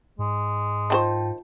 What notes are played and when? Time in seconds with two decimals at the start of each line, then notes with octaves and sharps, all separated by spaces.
0.19 G#2 G#3
0.90 D#3 E4 F4 C5 G5 A5